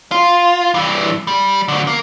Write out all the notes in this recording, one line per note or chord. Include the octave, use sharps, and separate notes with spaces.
F4
G2 E3
G3
D3 F#3
A#3